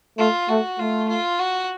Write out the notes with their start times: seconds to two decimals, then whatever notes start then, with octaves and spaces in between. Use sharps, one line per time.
0.18 A3 F4
0.49 A3 F#4
0.79 A3 F4
1.09 F4
1.39 F#4